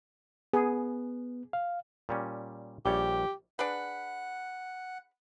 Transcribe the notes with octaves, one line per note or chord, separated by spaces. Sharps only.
B3 G#4
F5
A#2 G3 C#4
A#1 G3 G4 C#5
D4 G#4 B4 F#5